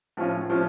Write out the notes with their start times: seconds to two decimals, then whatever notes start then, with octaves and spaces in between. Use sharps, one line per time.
0.17 A2 F3 C#4 F4
0.50 A2 F3 C#4 F4